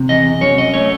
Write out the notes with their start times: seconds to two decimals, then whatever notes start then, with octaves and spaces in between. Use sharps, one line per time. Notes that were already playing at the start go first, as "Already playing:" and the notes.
Already playing: C3
0.09 E2 D#5
0.41 F#2 C#5
0.58 D#5
0.74 A3 C#5